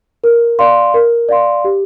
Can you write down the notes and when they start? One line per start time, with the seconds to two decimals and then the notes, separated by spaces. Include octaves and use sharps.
0.24 A#4
0.59 D5 F5 C6
0.94 A#4
1.29 D5 F5 C6
1.65 G4